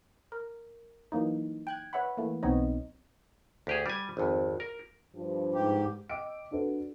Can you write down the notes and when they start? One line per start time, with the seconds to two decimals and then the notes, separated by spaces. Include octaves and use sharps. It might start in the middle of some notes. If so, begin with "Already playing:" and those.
0.32 A#4
1.12 E3 F#3 A#3 D#4
1.67 G5 F#6 G#6
1.93 B4 C#5 E5 F#5 B5
2.17 E3 A3 A#3
2.43 B1 B3 C4 D#4 C#5 D#5
3.67 D2 G4 G#4
3.86 G3 G#5
4.17 G#1 F2
4.60 A#4
5.14 G2 F3
5.54 G#2 G4
6.10 D#5 G5 D6 E6 D7
6.51 D4 F#4 A4 B4